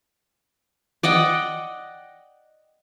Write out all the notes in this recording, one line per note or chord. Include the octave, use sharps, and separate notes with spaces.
D5 D#5 F#5 G5